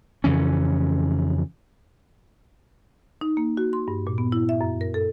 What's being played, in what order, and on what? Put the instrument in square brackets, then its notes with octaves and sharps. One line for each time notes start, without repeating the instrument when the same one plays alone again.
[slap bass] F2 C#3 E3 C#4
[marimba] D#4
A#3
F#4
C6
G2
A#2
B3
E4
E5
F#2
A#4
A4